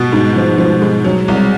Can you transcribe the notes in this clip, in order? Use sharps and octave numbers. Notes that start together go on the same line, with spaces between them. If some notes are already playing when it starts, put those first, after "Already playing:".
Already playing: B2 B3
G#2
F3
F3
G#3
F#3
C2